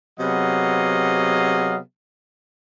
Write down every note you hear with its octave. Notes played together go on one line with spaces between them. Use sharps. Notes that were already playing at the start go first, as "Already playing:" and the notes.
C3 F#3 B3 G#4 D#5 F5